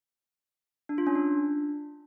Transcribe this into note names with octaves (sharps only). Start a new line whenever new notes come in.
D4
F4
C#4
D4